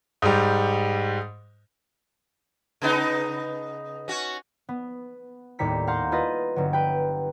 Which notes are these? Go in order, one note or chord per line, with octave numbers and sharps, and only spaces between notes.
G#2 G3
C#3 B3 D#4
C#4 F#4
B3
D#2 A2 G3 A#5 B6 C#7
F5 F#5 A#5 C6 G6
E4 F4 B4 D#5
G1 F#3
B4 G5